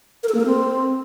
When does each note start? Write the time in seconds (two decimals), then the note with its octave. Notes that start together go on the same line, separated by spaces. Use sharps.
0.23 A#4
0.29 A4
0.34 A#3
0.40 A#4
0.46 C4